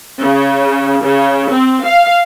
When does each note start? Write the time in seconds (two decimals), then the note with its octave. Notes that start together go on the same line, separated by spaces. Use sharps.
0.23 C#3
1.05 C#3
1.51 C4
1.85 F5